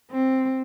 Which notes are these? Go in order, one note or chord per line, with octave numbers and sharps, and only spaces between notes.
C4